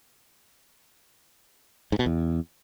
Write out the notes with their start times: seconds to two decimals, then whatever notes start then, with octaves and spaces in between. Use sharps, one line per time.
1.92 G#2
1.99 B2
2.06 E2